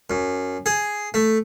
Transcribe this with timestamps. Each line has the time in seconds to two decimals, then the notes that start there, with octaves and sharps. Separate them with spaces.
0.10 F#2
0.66 G#4
1.14 A3